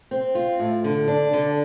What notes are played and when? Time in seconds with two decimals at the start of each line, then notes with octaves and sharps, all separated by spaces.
0.11 C4
0.35 F4
0.60 A2
0.84 D3
1.08 D4
1.33 D3